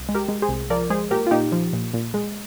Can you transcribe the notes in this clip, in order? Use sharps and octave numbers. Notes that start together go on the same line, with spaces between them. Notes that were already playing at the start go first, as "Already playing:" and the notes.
Already playing: C2
G#3
G4 A#4
G#3
G#4 C5
C2
F3 A#4 D5
G#3 G#4 C5
A#2 G4 A#4
F4
A#2 D#4 G4
F3
A#2
A#2
G#3